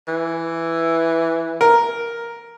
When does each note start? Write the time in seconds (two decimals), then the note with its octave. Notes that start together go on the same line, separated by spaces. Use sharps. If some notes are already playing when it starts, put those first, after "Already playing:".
0.08 E3
1.61 A#4